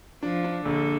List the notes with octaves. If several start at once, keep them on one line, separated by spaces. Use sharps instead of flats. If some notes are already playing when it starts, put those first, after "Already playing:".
F3 D4
D4
A#1 D3